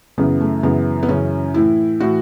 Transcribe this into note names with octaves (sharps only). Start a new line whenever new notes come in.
F#2 C#3 E3 B3
A3
F#2 C#3 E3 B3
B3
F#2 C#3 E3 C#4
A2 E3 E4
A2 E3 F#4